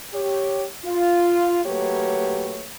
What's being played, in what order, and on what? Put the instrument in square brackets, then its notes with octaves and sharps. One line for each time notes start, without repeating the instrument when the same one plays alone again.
[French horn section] G4 C#5
F4
F#3 A3 A#3 G4 B4 C#5